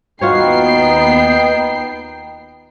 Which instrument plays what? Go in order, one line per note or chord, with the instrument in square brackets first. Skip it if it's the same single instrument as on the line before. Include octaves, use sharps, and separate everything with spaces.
[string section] D#2 B3 C7 [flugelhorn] D#4 [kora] F4 F#4 C#5 [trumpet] G5